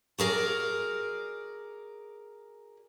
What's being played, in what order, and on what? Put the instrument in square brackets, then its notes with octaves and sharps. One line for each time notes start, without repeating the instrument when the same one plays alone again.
[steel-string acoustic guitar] F#4 G#4 A#4 D5